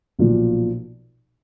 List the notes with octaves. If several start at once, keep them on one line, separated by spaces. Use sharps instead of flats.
B1 A#2 F3